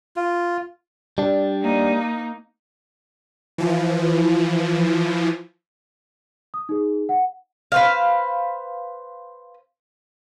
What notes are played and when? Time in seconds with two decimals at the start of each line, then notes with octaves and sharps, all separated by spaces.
0.16 F4
1.18 G3 D4
1.62 A#3 D#4
3.58 E3 F3
6.54 D#6
6.69 D#4 G#4
7.09 F#5
7.72 B4 C5 F5